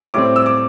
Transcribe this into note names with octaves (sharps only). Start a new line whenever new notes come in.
A2 G3 C4 D6
E6
D6